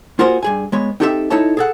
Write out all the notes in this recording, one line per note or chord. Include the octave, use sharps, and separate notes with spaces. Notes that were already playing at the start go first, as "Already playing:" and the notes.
A#3 F4 F#4 G#4 A#4 C5
G2 G#4 G#5
G#3 B3 C#5
C4 D#4 G4 A4 C#5 E5
D#4 E4 A4 C#5 A5
G#4 A4 F#5